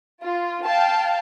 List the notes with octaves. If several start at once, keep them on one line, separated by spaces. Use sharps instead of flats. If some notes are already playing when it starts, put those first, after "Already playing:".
F4
F5 G5 A5